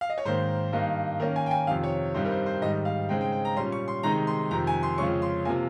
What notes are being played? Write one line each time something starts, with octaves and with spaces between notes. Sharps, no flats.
F5
D#5
C#5
G#2 D#3 A#3 C5
G2 D#3 A#3 D#4
D#3 A#3 C#4 A#4
G#5
G5
G#5
F2 C3 D#3 F5
C#5
G2 G3 C4 D#4 C5
A#4
C5
C5
G#2 D#3 G3 D#5
F5
C#3 G#3 C4 D#4 G5
G5
G5
A#5
A#2 G3 C#4 C6
C#6
C6
C3 D#3 G#3 D#4 A#5
C6
F2 C3 D#3 A#5
G#5
C6
F2 C#3 F3 G#3 C#4 C#6
C6
C3 F3 A#3 G#5